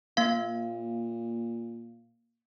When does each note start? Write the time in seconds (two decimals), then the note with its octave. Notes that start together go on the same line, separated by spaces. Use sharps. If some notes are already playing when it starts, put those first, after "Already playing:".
0.17 A#2 A#3 F5